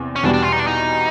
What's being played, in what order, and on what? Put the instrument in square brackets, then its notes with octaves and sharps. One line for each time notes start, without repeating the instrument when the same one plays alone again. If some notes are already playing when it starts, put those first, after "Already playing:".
Already playing: [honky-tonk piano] E2 C3
[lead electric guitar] C#4
[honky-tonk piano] E2 B2 G3 [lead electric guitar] D4
[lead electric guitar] D4
F4
D#4
D4
D#4